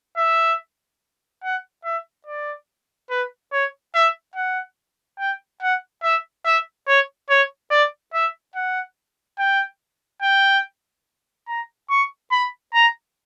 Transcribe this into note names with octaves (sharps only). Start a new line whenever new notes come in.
E5
F#5
E5
D5
B4
C#5
E5
F#5
G5
F#5
E5
E5
C#5
C#5
D5
E5
F#5
G5
G5
A#5
C#6
B5
A#5